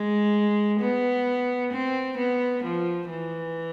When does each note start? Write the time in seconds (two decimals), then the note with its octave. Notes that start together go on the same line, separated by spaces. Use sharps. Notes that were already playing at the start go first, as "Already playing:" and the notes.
Already playing: G#3
0.80 B3
1.72 C4
2.17 B3
2.63 F3
3.10 E3